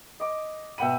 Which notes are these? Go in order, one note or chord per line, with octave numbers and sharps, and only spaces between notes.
D#5 D6
B2 E5 F#5 G5 B5 D#7